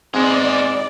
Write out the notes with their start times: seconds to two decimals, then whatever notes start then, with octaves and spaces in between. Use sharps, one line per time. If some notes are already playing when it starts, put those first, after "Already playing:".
0.14 G#2 G#3 C4 E4 G#4 D5